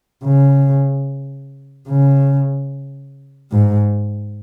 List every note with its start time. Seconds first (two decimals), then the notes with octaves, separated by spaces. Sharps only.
0.24 C#3
1.88 C#3
3.51 G#2